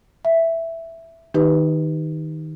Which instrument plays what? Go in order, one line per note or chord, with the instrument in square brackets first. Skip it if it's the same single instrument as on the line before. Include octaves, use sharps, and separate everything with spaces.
[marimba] E5
D#3 D#4 G4 B4